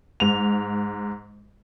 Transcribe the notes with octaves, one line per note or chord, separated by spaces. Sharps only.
G#2 F7